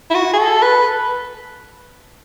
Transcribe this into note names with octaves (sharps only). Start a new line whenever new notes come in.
E4
F#4
G#4
A4
B4